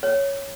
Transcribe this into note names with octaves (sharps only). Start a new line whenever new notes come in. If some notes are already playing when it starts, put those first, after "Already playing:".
C#5